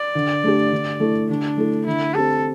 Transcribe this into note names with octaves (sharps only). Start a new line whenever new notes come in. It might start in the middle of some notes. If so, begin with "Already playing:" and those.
Already playing: D5
D3
A3 D4 G4
D3
A3 E4 A4
D3 D4
A3 E4 A4
D3 E4
C4 G4 A4